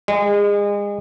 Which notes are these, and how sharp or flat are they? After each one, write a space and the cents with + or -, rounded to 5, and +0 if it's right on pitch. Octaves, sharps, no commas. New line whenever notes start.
G#3 -30